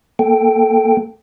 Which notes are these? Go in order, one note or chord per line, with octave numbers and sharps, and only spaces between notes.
A#3 A4 G5